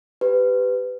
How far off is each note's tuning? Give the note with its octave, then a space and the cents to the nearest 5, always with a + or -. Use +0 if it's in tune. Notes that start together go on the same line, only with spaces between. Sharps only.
G4 +0 B4 +20